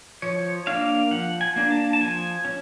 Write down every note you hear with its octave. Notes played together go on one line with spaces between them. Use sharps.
F3 C#5
A#3 D4 F5
F3 F#5
G#5
A#3 D4
A5
A5
F3 G#5
C#4